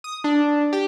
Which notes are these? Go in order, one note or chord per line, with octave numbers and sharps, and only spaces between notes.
D#6
D4
G4